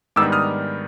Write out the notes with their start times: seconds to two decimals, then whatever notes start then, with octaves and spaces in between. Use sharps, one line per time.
0.16 G#2 D#3 G3 B3 D4 D6 E6
0.32 D#6 F6